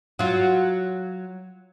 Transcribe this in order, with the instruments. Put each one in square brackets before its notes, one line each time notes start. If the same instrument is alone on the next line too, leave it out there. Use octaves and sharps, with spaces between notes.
[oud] F#3 F4